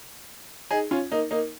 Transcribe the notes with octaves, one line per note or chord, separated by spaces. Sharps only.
D#4 G#4
C#4 F4
A#3 D#4
A#3 D#4